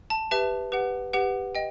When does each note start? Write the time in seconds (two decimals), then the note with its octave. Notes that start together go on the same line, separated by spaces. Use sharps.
0.10 A5
0.31 G4 B4 E5 A5
0.72 G4 B4 F#5
1.13 G4 B4 F#5
1.55 D#5 G5